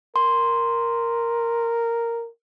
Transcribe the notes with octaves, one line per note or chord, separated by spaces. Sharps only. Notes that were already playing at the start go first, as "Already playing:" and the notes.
A#4 C6